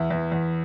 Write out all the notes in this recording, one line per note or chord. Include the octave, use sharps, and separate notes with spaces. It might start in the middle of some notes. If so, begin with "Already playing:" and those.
Already playing: E2 E5
E2
E2